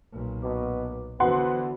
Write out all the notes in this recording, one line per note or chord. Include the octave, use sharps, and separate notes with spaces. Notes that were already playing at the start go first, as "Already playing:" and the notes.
B1 A#2
B2 D6
D3 E3 B3 F#4 C5 F#5 C6